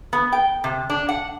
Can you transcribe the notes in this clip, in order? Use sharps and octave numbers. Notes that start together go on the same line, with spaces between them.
B3
G5
C3
D4
F#5